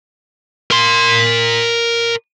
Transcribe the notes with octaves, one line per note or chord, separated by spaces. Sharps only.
A#4 C6